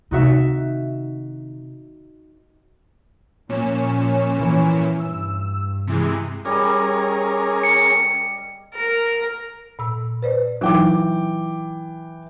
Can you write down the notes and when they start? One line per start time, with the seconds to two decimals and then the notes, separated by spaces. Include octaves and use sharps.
0.11 C3 D#3 D#4 F#4 E5
3.49 A#2 F3 C#4 E7
4.38 E3
5.00 G2 E6
5.87 C3 E3 G#3
6.45 G3 C#4 G#4 A#4 D#5
7.63 C#7
8.74 A#4
9.79 A#2 E6
10.22 B4 C5 D5
10.61 E3 F#3 D#4 F4 G5 D6